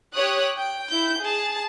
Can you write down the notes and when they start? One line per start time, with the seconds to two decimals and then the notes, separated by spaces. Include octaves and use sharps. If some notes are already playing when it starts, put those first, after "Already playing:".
0.13 G4 C#5 D#6 F#6
0.57 G5
0.89 E4 G6
1.20 G#4 A5